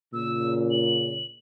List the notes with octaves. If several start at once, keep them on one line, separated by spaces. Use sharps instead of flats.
A#2 C#3 E6
F#7